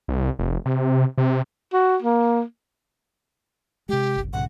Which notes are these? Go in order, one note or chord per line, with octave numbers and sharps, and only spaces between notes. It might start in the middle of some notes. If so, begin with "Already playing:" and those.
C2
F1
C3
C3
F#4
A#3
C3 G#3 G4
F#1 C2
B1 G#2 C#3 F#5